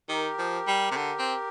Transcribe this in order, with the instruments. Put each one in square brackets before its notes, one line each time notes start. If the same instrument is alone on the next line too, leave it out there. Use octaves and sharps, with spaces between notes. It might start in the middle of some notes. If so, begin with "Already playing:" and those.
[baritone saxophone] D#3 [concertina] G4 A#4
[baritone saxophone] F3
G3
C3
D3
C4